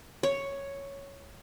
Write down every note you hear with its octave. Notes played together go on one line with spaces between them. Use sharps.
C#5